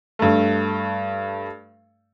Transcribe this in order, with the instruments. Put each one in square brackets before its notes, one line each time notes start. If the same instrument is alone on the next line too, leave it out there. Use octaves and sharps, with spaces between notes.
[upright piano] G2 A3